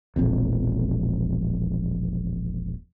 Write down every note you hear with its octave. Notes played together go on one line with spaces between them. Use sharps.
E1 A#1 F2